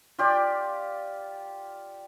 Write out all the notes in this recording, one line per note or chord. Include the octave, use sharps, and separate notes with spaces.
F4 G4 D5